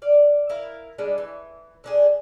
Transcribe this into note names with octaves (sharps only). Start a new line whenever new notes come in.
D5 F5
E4 A#4 F5
G3 G#3 D4
E3
D3 D4 G#4